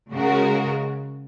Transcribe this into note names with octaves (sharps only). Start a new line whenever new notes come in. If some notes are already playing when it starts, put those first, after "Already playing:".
C#3 G#3 F#4 A#4